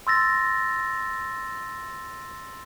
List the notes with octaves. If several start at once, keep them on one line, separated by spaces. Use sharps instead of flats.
C6 E6 A6 A#6